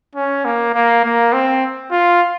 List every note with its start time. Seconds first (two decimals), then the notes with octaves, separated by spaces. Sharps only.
0.15 C#4
0.45 A#3
0.74 A#3
1.04 A#3
1.33 C4
1.91 F4